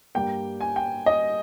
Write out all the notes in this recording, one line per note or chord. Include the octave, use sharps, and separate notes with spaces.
G2 G3 A#3 G5
G#5
G5
D#5